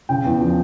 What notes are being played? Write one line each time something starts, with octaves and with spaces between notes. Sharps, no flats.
C#3 G5
E2
F3